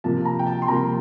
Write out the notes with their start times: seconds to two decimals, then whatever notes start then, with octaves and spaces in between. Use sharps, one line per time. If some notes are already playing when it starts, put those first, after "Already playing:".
0.04 C3 F3 A#3 A5
0.25 A#5
0.39 G5
0.47 A5
0.62 C6
0.67 C3 F3 A#3 A#5